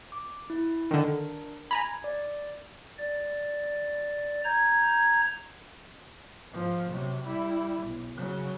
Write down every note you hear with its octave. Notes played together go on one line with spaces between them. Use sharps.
D6
E4
D3 D#3 D4 A#4
G#5 A#5 B5 G#6
D5
D5
A#5 G6 G#6
G#2 F3
C3 F#3
G3 E4
B1
C#3 F#3